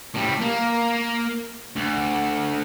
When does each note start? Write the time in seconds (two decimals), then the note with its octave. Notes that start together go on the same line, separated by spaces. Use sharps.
0.14 A2 G3
0.41 A#3
1.76 D2